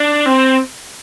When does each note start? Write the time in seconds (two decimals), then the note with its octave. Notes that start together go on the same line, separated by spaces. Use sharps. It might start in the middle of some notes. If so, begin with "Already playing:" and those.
Already playing: D4
0.26 C4